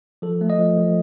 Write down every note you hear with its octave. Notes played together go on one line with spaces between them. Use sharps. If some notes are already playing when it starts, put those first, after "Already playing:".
F3 A4
A3
D#5
F3
F3